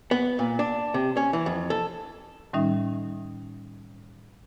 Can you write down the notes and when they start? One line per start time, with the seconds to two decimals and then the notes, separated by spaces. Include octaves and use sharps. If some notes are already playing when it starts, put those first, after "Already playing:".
0.11 B3
0.39 A#2
0.59 D4
0.94 C3
1.17 C#4
1.33 E3
1.46 F2
1.70 A4
2.53 A2 D#3 G3 C#4 D#4 E5